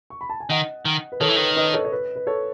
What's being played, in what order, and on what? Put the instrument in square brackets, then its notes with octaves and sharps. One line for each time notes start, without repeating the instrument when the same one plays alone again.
[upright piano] C#6
B5
A5
G#5
[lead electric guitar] D#3 [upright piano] D#5 F#5
[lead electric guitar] D#3
[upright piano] B4
[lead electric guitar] D#3 [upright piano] A4 C#5
[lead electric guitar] E3
[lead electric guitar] D#3 [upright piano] B4
[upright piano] B4 D#5
A4 C#5
C#5
B4
B4
A4 C#5